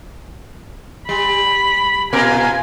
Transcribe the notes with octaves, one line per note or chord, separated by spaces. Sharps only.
G3 B5
A#2 F4 A#4 G#5